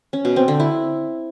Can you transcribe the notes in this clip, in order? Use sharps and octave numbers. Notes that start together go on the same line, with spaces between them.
C#4
B2
C4
D3
E4